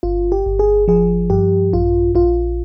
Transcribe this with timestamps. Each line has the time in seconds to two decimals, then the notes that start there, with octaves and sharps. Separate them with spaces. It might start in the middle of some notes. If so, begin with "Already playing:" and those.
0.03 G1 F4
0.32 G4
0.46 G1
0.59 G#4
0.88 F3 G#4
1.30 G2 G4
1.73 A#1 F4
2.15 A#1 F4